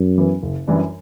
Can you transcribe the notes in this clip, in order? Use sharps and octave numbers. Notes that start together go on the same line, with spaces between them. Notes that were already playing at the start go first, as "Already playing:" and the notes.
Already playing: F#2
E3 B3
F#1
F#2 E3 G3 D4